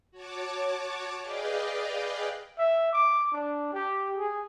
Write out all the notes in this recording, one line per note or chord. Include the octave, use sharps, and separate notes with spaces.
F#4 C#5 A5 D6
G#4 B4 D5 D#5 F5 G5
E5
D6
D4
G4
G#4